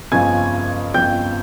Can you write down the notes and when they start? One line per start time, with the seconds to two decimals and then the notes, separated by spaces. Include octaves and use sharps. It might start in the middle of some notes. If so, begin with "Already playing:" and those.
0.12 G1 F2 C#3 F3 G#5 G#6
0.94 G1 F2 C#3 F3 G5 G6